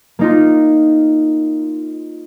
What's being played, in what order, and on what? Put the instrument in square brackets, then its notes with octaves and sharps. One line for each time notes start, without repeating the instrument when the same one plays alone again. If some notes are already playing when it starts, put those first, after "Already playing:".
[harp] A#3 D#4 F4